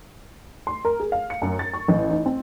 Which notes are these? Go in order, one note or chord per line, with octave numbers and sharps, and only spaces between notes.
C6
A#4
G#4
F5
C#7
F#2
A6
C#6
A1
D#4
C4